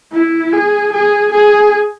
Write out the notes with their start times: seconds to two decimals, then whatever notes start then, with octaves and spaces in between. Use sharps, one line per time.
0.12 E4
0.52 G#4
0.92 G#4
1.32 G#4